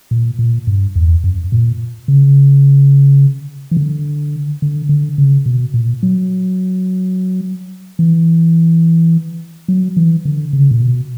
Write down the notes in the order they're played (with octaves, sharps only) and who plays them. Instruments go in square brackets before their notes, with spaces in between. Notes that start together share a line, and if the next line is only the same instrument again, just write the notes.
[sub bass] A#2
A#2
G2
E2
F#2
A#2
C#3
E3
D3
D3
D3
C#3
B2
A#2
F#3
E3
F#3
E3
D3
C#3
A#2
B2